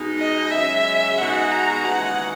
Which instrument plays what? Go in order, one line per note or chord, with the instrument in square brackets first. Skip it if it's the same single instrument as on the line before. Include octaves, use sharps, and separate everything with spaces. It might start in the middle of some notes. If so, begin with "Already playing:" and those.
Already playing: [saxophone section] B2 G#3 D#4 G#4
[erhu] D#5
[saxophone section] F#2 C#3 G#3 [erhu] E5
[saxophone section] B2 G#3 D#4 F#4 [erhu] F#5
[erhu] A#5
[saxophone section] D#2 C#3 E3 G#3 [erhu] F#5